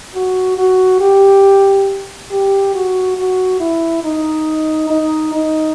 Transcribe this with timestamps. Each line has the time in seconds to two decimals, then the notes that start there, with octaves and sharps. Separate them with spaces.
0.15 F#4
0.58 F#4
1.00 G4
2.31 G4
2.74 F#4
3.18 F#4
3.60 E4
4.04 D#4
4.90 D#4
5.33 D#4